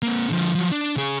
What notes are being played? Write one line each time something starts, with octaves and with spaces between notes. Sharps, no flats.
A#3 C4
D3 F3
F3 F#3
D4
C#3 G#4